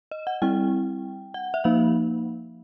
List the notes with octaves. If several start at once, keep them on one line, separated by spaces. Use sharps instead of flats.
D#5
F#5
G3 C4 E4 G5
F#5
E5
F3 A#3 D#4 F5